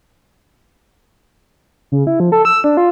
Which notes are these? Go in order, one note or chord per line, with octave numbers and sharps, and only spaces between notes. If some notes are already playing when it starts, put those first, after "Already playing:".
C#3
E4
F3
A4
E6
D4
F4